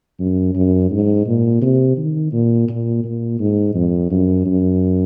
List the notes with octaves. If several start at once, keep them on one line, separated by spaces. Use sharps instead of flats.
F#2
F#2
G#2
A#2
C3
D#3
A#2
A#2
A#2
G#2
F2
F#2
F#2